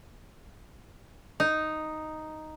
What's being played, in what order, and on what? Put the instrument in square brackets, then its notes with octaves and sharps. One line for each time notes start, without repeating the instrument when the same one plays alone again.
[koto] D#4